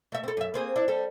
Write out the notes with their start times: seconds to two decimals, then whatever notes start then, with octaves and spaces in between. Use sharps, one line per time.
0.12 A3 E5
0.24 C4 A4
0.37 F#2 E5
0.54 A#3 C4 G#4
0.76 D4 E4
0.88 G3 A4